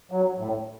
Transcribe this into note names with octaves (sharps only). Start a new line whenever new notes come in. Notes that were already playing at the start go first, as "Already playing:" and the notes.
F#3
A2